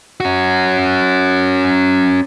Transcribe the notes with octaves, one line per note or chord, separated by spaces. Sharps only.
C#4 F#4